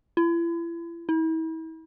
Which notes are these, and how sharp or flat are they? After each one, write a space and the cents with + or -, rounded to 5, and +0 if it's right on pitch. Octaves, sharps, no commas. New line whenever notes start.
E4 +40
E4 -40